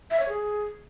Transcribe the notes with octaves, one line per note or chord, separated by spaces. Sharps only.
E5
C#5
G#4